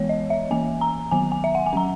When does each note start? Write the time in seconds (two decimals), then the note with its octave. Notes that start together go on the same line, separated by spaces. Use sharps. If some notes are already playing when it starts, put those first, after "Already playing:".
Already playing: E3 G#3 B3 C#5
0.09 D#5
0.30 E5
0.51 E3 A#3 C#4 G#5
0.81 A#5
1.11 D#3 F#3 B3 G#5
1.32 G#5
1.44 E5
1.55 F#5
1.66 G#5
1.73 F#3 C#4 A#5